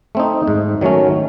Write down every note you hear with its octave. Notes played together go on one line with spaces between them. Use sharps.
A3 C4 D#4
G#2
D#3 F#3 A3 C#4